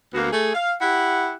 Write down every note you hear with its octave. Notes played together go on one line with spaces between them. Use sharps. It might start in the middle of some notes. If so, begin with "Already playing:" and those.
D2 A#3 B3 F#4
A3 G#4
F5
E4 G4 F#5